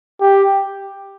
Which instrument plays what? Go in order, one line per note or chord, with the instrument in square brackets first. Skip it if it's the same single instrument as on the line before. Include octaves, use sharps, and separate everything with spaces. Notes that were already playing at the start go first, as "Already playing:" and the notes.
[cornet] G4